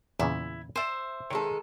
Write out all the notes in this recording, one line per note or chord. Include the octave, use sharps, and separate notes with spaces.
E2 A#2 C#3 E4
C5 D5 E5 G#5
D#3 G#3 A4 C#5 G5